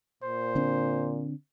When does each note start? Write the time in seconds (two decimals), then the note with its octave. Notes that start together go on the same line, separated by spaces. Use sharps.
0.23 A#2 C5
0.55 D3 C4 D4